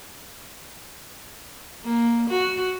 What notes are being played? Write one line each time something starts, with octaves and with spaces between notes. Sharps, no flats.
A#3
F#4